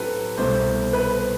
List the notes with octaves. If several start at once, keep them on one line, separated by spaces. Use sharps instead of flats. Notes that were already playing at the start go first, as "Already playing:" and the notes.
Already playing: A2 F#3 C4 G4 A4 B4
C2 B2 A3 C4 C5
B4